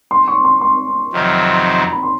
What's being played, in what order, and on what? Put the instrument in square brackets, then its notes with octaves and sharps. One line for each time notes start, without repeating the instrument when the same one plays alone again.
[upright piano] C6
C#6
C6
C6
[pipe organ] F2 C3 D#3 F#3
[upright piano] A#5
B5
C6